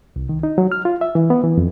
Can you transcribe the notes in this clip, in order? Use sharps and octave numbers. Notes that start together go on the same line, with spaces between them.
C2
D#3
D#4
F#3
F6
F4
E5
E3
B3
E3
F2